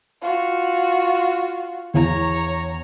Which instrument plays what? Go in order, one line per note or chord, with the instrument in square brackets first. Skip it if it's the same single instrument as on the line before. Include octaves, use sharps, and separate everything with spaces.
[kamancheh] F4 F#4
[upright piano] E2 [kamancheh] C#5 A#5